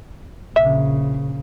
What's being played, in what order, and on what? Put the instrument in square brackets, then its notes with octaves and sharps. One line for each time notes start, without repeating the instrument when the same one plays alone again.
[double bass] A#1 C#3 [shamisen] E5